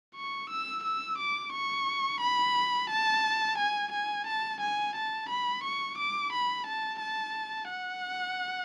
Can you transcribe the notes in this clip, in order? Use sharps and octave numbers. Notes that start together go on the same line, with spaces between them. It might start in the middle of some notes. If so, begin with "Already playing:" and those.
C#6
E6
E6
D6
C#6
B5
A5
G#5
G#5
A5
G#5
A5
B5
C#6
D6
B5
A5
A5
F#5